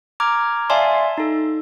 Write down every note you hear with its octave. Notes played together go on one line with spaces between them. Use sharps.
A#5 D6 F6 G#6
D5 E5 F5 G#5 A5 C6
D#4 A4